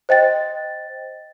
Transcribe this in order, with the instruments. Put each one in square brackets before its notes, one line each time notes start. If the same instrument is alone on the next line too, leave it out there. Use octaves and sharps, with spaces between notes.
[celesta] C5 D#5 G5 A6